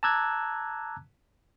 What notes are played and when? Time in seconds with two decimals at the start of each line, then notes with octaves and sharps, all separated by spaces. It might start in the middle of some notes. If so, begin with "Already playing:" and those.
0.03 A5 A#5 D6 E6 F#6 G#6